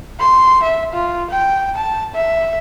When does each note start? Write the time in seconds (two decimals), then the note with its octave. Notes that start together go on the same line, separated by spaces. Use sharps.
0.20 C6
0.63 E5
0.93 F4
1.30 G5
1.76 A5
2.14 E5